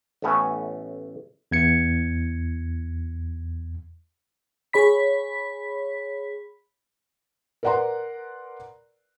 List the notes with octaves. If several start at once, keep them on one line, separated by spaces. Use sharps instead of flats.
A1 A2 A3 B3 C#4
E2 G#6 C#7
G#4 C#5 B5 B6
A#4 B4 D5 F#5 A#5 C6